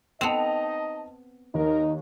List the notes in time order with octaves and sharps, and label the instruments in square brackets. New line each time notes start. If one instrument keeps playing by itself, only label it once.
[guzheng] B3 C4 [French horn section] D#4 D#5 [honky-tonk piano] A5 F7
[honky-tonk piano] D#2 [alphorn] D#4 [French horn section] A#4